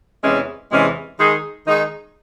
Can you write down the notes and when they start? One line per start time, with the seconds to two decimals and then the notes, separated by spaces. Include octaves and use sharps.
0.23 E2 C3 E3 G#3 C#4
0.71 E2 C3 E3 G#3 C#4
1.18 D#3 G#3 D#4 G#4
1.65 D#3 G#3 D#4 G#4